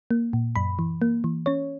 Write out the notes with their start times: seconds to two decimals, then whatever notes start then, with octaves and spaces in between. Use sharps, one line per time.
0.11 A#3
0.33 A#2
0.56 F#2 B5
0.79 E3
1.02 A#3
1.24 E3
1.46 C#4 C#5